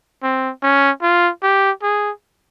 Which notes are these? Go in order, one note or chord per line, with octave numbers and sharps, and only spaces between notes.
C4
C#4
F4
G4
G#4